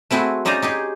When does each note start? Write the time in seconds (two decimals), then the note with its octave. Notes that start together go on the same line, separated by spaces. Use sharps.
0.11 A3 C4 E4 F#4 G#4
0.45 C#4 D#4 C5 D5 G#5 A#5
0.62 D#4 G4 G#4